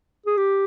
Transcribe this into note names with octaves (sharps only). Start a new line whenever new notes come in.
G#4
G4